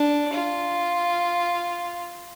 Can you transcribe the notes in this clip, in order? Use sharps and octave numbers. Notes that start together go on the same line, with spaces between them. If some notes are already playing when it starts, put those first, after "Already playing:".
Already playing: D4
F4